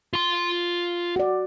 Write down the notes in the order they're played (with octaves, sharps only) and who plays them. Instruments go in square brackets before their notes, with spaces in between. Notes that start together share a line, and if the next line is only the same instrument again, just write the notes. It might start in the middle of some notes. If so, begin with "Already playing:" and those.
[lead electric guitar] F4 C6
[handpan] F#4 D5